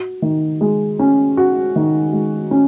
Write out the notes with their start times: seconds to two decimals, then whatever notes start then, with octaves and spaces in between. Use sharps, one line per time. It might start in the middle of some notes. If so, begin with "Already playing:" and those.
Already playing: F#4
0.22 D#3
0.61 G#3
0.99 C#4
1.37 F#4
1.76 D#3
2.13 G#3
2.51 C#4